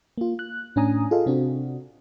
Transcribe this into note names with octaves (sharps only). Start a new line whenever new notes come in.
A#3 F4
F#6
A2 C#4 D4 G#5 A#5 D#6
F4 G#4 A4 D#5 F5
C3 C4 D4 F#4